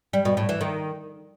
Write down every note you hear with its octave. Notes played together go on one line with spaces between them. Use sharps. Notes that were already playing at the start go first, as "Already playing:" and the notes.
G3
B2
A2
E3
D#3